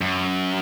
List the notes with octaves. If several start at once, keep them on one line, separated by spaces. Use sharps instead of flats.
F#2